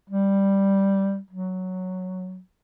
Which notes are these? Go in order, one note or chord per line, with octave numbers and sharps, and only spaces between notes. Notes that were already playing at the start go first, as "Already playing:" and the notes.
G3
F#3